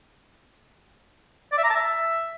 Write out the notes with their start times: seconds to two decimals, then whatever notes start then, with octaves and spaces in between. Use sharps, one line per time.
1.52 D5
1.58 E5
1.64 A#5
1.70 A5
1.76 E5